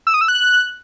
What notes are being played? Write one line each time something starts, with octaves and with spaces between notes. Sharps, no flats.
E6
D#6
E6
F#6